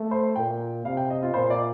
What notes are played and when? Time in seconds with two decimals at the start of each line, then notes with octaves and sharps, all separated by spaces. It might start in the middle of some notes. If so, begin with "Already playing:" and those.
Already playing: A3
0.11 C5
0.36 A#2 G5
0.85 C3 F5
0.97 G5
1.10 D#5
1.23 F4
1.34 A#2 C5
1.50 D5